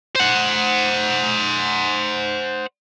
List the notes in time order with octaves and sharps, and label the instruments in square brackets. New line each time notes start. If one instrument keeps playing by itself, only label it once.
[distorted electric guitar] C5 F#5